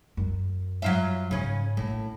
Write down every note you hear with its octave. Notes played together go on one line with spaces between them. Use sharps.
F#2
F#3 F4 E5
G#2 C#3 C#4
A#1 A2